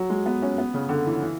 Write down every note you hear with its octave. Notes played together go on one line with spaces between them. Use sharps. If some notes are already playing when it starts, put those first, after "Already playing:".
Already playing: F#3
G#3
B3
C#4
B3
C#3
D3
E3
E3